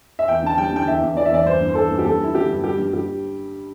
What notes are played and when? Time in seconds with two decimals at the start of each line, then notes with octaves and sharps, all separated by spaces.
0.19 E5
0.28 E2 G5
0.42 D3 A5
0.58 G3 G5
0.72 D3 G5
0.87 E2 E5
1.02 E2
1.17 E3 D5
1.26 E5
1.31 E2 D5
1.46 G2 C5
1.61 G2
1.69 C5
1.75 E3 A4
1.91 G2
1.98 G4
2.06 G2 A4
2.20 G3 E4
2.35 D3 G4
2.49 G2
2.64 G3 G4
2.78 G2
2.93 G2 G4